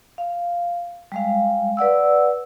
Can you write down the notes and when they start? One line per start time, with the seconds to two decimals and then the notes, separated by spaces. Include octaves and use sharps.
0.18 F5
1.12 G3 G#3 F5
1.77 B4 D5 F#5 E6